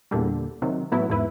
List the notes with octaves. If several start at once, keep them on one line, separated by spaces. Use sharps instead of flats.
E2 A#2 D3 G3
C3 D#3 F#3
A2 E3 F#3 B3 E4
E2 G#2 E4 B4